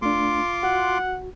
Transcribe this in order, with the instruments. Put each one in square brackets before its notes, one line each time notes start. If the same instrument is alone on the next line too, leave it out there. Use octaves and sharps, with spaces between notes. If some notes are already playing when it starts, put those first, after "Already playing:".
[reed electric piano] A3 D4 [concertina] F4 C6 D6
[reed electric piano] F#4 [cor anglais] F#5